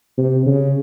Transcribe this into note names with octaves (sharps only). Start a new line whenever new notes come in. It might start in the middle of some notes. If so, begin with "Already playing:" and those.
C3
C#3